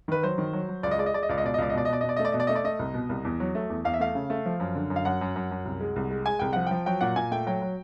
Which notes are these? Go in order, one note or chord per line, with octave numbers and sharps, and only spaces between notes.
D#3 B4
F#3 C5
D#3
F#3
F#3
C#2 D5
D#5
G#3 D5
D#5
G#3 D5
D#5
C#2 D5
D#5
B2 D5
D#5
C#2 D5
D#5
B2 D5
D#5
B2 D5
D#5
B2
D5
A3 D#5
D5
B2 D#5
D5
A3 D#5
D5
A3 D#5
C2
B2
C2
E2
F#3
A3
E2
E2 F5
E5
A3 F5
C#3
A3
F3
F#2
D3
F#2
F5
F#2 F#5
F#2
F#2
F#2
C2
G#3
C2
G#3
G#3 G#5
C2 G5
F3 F#5
F3 G5
F#3 G5
A#2 F#5
A#2 G#5
A3 G5
F#3 G5
F#3